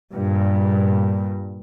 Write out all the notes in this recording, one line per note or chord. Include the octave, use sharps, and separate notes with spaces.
G2 A#2